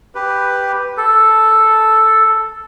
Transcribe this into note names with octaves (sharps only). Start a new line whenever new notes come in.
G4 B4
A4